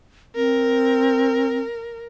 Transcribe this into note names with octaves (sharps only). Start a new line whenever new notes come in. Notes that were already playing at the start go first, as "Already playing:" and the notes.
C4 A#4